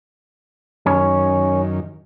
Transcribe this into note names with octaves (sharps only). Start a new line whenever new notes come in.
F#2 D#3 C#4